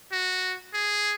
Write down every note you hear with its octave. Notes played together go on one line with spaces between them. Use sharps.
F#4
G#4